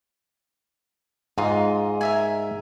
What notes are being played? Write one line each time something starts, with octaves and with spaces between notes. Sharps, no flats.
G#2 D#4 F4 D#5
A#4 E5 G#5